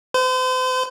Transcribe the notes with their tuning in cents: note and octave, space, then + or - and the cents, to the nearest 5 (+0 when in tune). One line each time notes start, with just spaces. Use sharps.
C5 -40